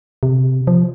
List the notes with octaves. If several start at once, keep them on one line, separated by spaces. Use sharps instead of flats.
C3
F3